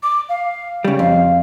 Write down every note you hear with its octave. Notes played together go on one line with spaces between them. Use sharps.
D6
F5
C#3 G3
F2 F5